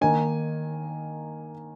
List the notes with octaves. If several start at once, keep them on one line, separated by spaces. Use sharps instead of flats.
D#3 A#3 D#4 G#5